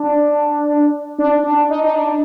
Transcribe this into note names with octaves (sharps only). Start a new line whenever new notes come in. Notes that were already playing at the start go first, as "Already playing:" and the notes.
Already playing: D4
D4
D4
D#4
D#4
D4